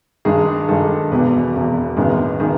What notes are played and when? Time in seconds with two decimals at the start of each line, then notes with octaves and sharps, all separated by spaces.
0.25 G2 D#3 G#3 G#4
0.69 G2 D#3 G#3 A4
1.11 E1 E2 B2 B4
1.54 E1 E2 B2
1.97 A1 G2 D#3 G#3 B3
2.40 D#3 G#3 B3